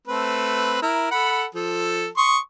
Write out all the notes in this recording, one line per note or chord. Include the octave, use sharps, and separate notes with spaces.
A3 C4 B4
E4 A#4
A4 F#5 B5
F3 A4
C6 C#6 D#6